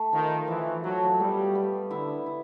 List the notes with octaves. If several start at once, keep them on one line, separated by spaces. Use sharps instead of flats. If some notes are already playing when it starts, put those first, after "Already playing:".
Already playing: A3
D#3 F3
E3 F3
F#3 A3
G3 B3
B3
D3 E4
E4